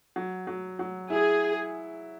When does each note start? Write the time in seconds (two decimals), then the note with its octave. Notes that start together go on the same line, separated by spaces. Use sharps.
0.16 F#3
0.47 F#3
0.79 F#3
1.10 E4 G#4